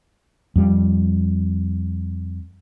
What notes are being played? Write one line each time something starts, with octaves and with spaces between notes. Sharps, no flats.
F2 G3